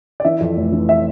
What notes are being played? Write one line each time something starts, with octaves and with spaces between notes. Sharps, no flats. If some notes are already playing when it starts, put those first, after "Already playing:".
D5
E3 E5
F2
F1
E3
E5